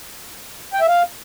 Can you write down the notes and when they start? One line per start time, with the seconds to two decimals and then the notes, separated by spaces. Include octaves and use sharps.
0.73 G5
0.81 E5
0.88 F5